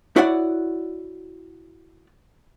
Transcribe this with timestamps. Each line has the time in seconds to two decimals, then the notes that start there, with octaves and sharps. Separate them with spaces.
0.16 E4 F#4 C#5 D5 F#5